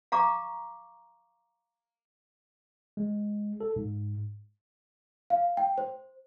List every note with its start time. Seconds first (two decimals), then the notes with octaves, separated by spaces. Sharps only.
0.12 F5 A#5 C#6 D6
2.97 G#3
3.61 A4
3.76 G#2
5.30 F5
5.57 G5
5.78 C5